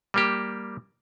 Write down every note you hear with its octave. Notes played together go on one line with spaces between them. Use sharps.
G3 A#3 G4